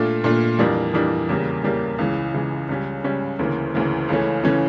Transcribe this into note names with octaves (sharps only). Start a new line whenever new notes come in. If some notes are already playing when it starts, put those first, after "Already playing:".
Already playing: A#2 A3 D4 F4
A#2 A3 D4 F4
F2 E3 G3 A#3 D4
F2 E3 G3 A#3 D4
E2 C#3 G3 A#3
E2 C#3 G3 A#3
C#2 C#3 E3
C#2 C#3 E3
C#2 C#3 G3 C#4
C#2 C#3 G3 C#4
D2 C#3 E3 A#3
D2 C#3 E3 A#3
C#2 C#3 E3 A3 C#4
C#3 E3 A3 C#4